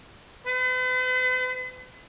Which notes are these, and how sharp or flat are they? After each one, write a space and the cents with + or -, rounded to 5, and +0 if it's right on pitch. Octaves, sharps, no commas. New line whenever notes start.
B4 +45